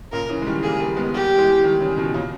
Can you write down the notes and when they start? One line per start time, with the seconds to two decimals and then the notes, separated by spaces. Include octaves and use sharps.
0.12 A#2 C#3 A#4
0.29 C#3 E3
0.42 G#3
0.47 D#3 G3
0.63 G3 A#3 G#4
0.80 G3 A#3
0.96 G#3 B3
1.13 G3 A#3 G4
1.38 E3 G#3
1.64 D#3 G3
1.81 C#3 E3
1.97 B2 D#3
2.14 A#2 C#3